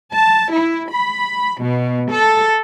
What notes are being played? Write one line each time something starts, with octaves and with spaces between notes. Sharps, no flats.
A5
E4
B5
B2
A4